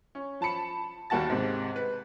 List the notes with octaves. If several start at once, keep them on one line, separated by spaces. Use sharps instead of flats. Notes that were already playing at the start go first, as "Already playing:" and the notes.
C#4
F3 A5 B5 C#7
D#2 G3 A#3 F#4 A5 A6
G#2 C3
B4